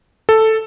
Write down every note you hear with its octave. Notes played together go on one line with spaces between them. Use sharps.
A4